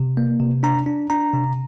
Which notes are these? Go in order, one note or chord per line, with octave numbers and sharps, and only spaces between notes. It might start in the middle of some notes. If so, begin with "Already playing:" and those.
Already playing: C3
A#3
C3
D4 A#5
D4
D4 A#5
C3